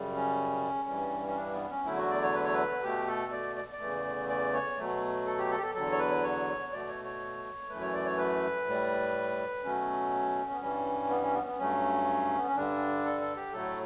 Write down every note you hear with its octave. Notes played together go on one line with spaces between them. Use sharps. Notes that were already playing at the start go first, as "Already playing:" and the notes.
Already playing: F#2 C#3 G3
C#4
G2 E3 G3
C#4
D4
B3
C#4
E2 D3 F#3 A3 E4
F#4
D5
C#5
B4
C#5
B4
B2 A3 G4
A4
D5
D5
D5
E2 C#3 E3 A3
D5
C#5
B2 F#3 A3
A4
G4
A4
G4
A4
E2 D3 F#3 A4
C#5
B4
C#5
B2 A3 D5
C#5
C#5
F#2 E3 A3 B4
C#5
D5
C#5
B4
A2 G3
B2 F#3 A3 C#4
B3
G2 E3 G3 C#4
B3
C#4
B3
B3
G2 F#3 A3 C#4
B3
C#4
G2 D3 G3 D4
A4
A4
G4
A2 F#3 A3 A4